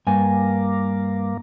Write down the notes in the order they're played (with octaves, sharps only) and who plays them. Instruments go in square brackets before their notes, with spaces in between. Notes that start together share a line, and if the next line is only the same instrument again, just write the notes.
[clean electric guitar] G2 G#5 [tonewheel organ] A#3